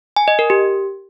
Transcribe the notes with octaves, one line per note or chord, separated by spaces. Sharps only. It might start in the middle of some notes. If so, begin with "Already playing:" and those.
G#5
D#5
A#4
G4